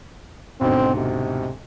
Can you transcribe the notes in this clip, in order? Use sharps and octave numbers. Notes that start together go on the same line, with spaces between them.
D2 G#2 B2 C4
C3